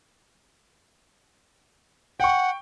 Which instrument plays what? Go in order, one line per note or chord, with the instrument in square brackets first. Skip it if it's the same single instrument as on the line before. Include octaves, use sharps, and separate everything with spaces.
[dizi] F#5 [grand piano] G5 C#6